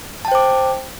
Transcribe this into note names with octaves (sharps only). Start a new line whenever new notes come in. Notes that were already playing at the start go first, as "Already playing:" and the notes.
C5 G5 A5 D6